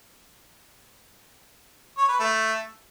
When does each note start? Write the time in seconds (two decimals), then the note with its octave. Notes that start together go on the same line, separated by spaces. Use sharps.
1.98 C#5
2.09 B4
2.20 A3